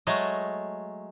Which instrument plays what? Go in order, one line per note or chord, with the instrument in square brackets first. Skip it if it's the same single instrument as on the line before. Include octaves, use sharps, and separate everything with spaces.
[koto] F#3 G#3 A3 A4 D#5